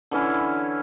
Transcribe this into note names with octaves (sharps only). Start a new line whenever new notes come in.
D3 E3 C#4 E4